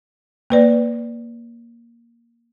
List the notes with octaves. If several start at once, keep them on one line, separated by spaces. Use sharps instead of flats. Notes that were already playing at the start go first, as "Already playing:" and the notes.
A#3 B4 D5